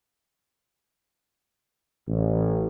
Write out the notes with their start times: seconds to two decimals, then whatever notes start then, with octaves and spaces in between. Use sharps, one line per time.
2.08 A1